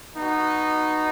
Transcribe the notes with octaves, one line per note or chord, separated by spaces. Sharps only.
B3 D#4 F#4